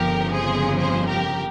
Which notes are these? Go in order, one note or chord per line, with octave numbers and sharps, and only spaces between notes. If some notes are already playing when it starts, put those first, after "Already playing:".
Already playing: G1 F2 C#3 F3 G4 A#4
G#4 C5
G#4 C5
G4 A#4